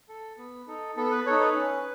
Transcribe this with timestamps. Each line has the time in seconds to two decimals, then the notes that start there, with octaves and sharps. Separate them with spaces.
0.09 A4
0.38 B3
0.67 D#4 A4
0.96 B3 A4
1.11 B4
1.26 D#4 A4 C#5
1.41 B4
1.55 C#4